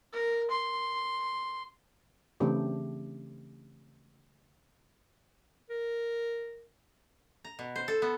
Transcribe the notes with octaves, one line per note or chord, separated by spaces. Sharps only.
A#4
C6
C#3 E3 A3 C4 D4 G4
A#4
A#5
B2
C5
A4
B3